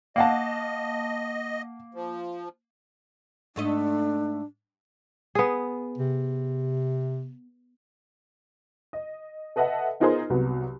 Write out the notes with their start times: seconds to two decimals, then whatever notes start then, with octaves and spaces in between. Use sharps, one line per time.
0.16 A#3 D#5 F5 F#5 A5
1.94 F3
3.56 G#2 A3 D4 D#5
5.35 B3 G#4
5.98 C3
8.93 D#5
9.56 A4 B4 D#5 E5 F#5 A5
10.00 B3 D#4 F4 G#4 A#4 C5
10.30 C2 F#3 B3